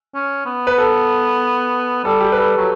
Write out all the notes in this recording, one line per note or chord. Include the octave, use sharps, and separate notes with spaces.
C#4
B3
B4
A4
G3 A4
G4
B4
A4
F#3